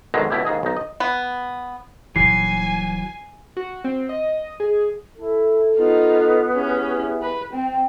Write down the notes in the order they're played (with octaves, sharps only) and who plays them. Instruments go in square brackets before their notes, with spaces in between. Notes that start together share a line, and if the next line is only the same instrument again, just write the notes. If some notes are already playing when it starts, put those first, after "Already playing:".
[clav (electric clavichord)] G#1 F#2 B2 D3 D#3 G#3
C#2 B2 E4 G4
D#2 G#2 G#4 D#5
B1 D#4
D#5
[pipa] B3
[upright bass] D#1 A#2 [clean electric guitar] E3 F#3 [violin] G#5 [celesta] C7
[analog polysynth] F#4
C4
D#5
G#4
[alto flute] E4 [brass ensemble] A4
[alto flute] B3 [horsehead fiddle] D#4 F4
[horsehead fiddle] C#4 [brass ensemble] E4 G4 G#4
[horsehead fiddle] B4
[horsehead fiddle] C4 [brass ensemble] G5